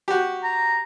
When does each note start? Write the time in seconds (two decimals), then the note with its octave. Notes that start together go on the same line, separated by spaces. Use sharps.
0.08 F#4 G4
0.43 A#5